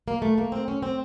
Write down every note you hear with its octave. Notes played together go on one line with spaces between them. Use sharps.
A#3
A3
A#3
C4
C#4
C4